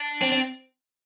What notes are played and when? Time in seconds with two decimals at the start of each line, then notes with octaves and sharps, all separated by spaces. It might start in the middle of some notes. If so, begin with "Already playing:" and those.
Already playing: D4
0.22 C4
0.32 C4